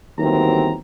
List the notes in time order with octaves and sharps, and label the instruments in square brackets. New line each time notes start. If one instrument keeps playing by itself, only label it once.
[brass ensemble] G1 D#2 E3 F#3 C4 A#5